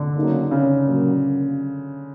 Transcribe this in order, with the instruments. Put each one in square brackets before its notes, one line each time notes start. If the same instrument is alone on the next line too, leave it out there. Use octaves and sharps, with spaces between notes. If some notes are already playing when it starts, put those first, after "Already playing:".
Already playing: [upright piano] D3
[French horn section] C#3 F#3 A#3 D#4
[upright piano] C#3
[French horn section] A#2 F#3 A#3